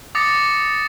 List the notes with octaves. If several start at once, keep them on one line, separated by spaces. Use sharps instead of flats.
D6 D#6 A6 A#6 C#7